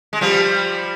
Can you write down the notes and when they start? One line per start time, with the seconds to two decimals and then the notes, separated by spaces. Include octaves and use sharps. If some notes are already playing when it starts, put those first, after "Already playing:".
0.13 G#3
0.21 F3 G3